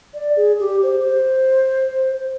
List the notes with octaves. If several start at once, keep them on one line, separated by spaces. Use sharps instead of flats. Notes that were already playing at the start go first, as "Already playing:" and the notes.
D5
G#4
G4
C5